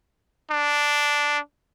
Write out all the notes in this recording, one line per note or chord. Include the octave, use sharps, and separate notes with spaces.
D4